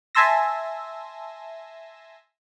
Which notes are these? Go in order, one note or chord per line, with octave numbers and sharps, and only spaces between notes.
E5 G#5 A5 C6 E6 A#6